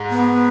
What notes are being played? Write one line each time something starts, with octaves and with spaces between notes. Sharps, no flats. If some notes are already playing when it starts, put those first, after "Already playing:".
Already playing: G#2 G#3
B3